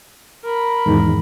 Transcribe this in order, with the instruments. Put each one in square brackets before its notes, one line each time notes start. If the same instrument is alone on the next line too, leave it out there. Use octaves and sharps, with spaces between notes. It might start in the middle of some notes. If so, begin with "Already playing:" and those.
[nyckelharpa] A#4 B5
[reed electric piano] E2 G#2 D#3